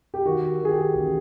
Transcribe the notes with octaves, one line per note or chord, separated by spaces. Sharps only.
G4
D#3 F#4
D#3 G#4
G4
A1